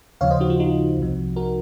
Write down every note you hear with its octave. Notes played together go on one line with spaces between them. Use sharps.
D#2 C#3 F3 C#5 F5
C5 D#5
D#4 F#4
F4
D#4 F#4
C2 C3 F3
F#4 A#4